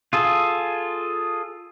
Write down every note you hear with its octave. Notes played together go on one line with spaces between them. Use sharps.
F4 G#4 A4